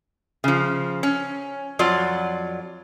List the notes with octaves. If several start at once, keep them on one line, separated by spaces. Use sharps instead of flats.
C#3 F3
C#4
F2 F#3 F4 D5